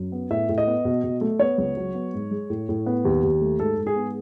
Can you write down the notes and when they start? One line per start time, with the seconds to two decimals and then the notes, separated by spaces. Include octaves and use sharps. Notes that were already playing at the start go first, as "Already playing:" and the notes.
Already playing: F#2
0.12 B3
0.30 A2 E5
0.49 A2
0.58 D#5
0.67 B3
0.85 B2
1.04 B2
1.21 A3
1.39 B3 C#5
1.58 C#2
1.77 F#3
1.94 B3
2.14 G#2
2.31 G#3
2.50 A2
2.69 A2
2.86 B3
3.05 D#2
3.23 D#2
3.41 A3
3.60 G#2 A4
3.77 G#2
3.87 G#4
3.96 B3